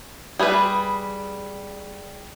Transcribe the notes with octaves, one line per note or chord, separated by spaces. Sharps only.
G3 G#4 A4 B4